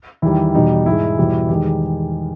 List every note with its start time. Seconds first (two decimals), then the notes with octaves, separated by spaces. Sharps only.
0.22 E2 D#3 G3 E4
0.55 E2 B2 G3 D#4
0.86 G#2 E3 G#3 E4
1.18 E2 B2 G3
1.49 E2 D#3 G#3 G4